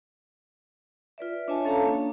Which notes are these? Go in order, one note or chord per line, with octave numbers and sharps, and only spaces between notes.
F4 B4 D5 E5
D4 C#5 D#5 E5 G#5 A5
C#4 A4 C#5 F5 A5 A#5
A#3 D4